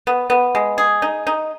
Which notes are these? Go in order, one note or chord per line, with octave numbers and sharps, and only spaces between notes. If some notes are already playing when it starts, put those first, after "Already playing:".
B3
B3
G#3
G#4
D#4
D#4